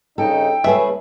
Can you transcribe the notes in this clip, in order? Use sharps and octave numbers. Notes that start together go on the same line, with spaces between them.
G2 C#3 D#4 A4 G5
C#2 A3 C#4 G#4 B4 E5